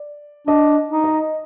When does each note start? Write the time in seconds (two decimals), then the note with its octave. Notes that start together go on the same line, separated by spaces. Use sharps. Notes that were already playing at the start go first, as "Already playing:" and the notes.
Already playing: D5
0.47 D4 D#5
0.90 D#4
1.04 D#5